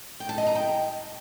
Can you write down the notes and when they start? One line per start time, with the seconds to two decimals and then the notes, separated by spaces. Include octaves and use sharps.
0.20 G5
0.29 A5
0.38 D#5
0.47 A#5
0.55 G5